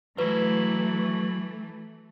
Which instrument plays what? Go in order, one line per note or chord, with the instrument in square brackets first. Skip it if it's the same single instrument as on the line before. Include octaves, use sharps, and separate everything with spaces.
[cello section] E3 A3 [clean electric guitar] F#3 E4 [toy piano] B4